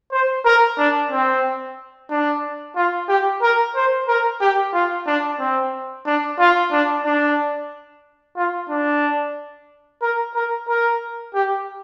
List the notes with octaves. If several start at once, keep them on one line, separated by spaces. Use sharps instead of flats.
C5
A#4
D4
C4
D4
F4
G4
A#4
C5
A#4
G4
F4
D4
C4
D4
F4
D4
D4
F4
D4
A#4
A#4
A#4
G4